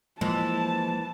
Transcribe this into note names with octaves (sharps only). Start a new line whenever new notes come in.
E3 F3 G#3 A#3 C5 A5